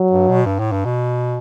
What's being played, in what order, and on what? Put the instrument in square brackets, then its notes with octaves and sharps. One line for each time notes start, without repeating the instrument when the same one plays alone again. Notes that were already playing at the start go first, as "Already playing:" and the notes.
Already playing: [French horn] F#3
[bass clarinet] G2
B2
G2
A2
G2
B2